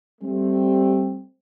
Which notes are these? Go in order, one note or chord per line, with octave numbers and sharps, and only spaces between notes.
G3 A3 C4